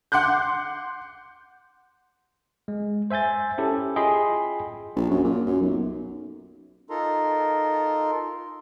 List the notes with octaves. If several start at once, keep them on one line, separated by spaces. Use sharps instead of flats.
F#5 C6 D6 F#6 G6
G#3
C5 E5 G#5 G6 A6
C#4 E4 G4 A4
F4 G#4 D#5 G5 B5 C6
A#1
F#2
A#2
F#2
B1
D#4 F4 A4 A#4 A#5 C6